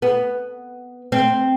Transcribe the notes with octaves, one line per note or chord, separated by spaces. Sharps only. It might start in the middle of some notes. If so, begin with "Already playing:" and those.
B3
C4